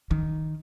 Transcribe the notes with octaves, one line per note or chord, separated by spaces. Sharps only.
D#3